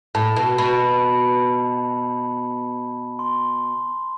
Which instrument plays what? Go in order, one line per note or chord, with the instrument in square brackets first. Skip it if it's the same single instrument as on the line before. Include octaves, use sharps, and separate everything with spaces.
[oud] A2 [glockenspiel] A5
[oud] B2
[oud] B2 [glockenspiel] B5
[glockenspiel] C6